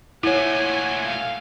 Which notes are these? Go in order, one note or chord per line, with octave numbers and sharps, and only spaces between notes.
A#2 A3 E4 C#5 F#5 G#5
F5